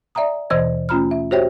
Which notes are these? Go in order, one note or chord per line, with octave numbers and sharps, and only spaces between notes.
D5 E5 G5 A#5 D#6
D#2 B2 E3 C5 D#5 G#6
A3 C#4 F4 A#5 B5 F6
E5
F#4 G4 C5 C#5 E5 G5